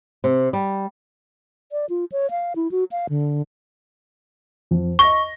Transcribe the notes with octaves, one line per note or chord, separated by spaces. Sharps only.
C3
G3
D5
F4
C#5
F5
E4
F#4
F5
D3
F2
D#5 C#6 A#6 G7